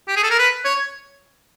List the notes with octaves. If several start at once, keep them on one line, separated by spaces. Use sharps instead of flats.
G4
G#4
A4
A#4
B4
C#5